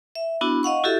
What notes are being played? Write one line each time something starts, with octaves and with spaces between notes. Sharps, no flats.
E5
B3 D4 E4 F#4
D#5 F5 F#5 C#6
E4 F#4 G4 A4 E5